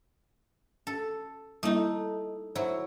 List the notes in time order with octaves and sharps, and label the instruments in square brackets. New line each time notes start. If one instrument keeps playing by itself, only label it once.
[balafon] C#4 [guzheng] A4
[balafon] G3 A#3 E4 [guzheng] A3 D#4
[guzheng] F#3 E4 [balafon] C5 E5